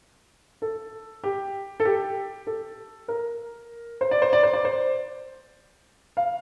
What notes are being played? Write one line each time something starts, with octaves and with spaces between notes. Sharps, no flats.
A4
G4
A4
G4
A4
A#4
C5
D5
C5
D5
C5
D5
C5
F5